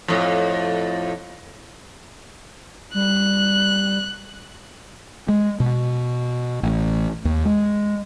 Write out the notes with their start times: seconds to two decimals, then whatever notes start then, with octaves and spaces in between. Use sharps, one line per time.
0.08 F2 A2
2.94 G3 F#6
5.29 G#3
5.60 B2
6.63 A1
7.25 D#2
7.45 G#3